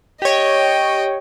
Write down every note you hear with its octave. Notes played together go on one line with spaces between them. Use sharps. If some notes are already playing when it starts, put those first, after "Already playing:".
G4 C#5 D#5 G5